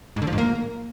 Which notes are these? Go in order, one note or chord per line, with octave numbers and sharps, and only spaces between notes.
G#2
D3
F3
G#2
A#3